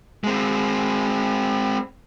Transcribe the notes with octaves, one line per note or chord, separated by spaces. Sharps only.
G#3 C4